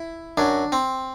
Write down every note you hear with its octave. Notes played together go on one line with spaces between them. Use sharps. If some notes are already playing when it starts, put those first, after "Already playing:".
Already playing: E4
F#2 F#3 D4
C4